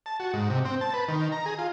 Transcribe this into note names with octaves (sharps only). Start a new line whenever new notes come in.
A5
F#4
G#2
C3
C4
A5
B4
D#3
A#5
G#4
F4